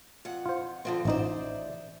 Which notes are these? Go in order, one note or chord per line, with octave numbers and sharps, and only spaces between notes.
F2 F#5
F4 C5
D3 F3 C4
A1 D#4 C5 D5 E5